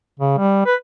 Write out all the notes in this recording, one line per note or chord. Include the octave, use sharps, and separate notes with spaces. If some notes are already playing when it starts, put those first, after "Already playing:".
C#3
G3
B4